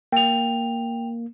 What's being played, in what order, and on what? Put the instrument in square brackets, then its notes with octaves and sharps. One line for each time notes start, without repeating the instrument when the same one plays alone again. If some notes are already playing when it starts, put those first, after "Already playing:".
[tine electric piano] A#3 [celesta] G5 F7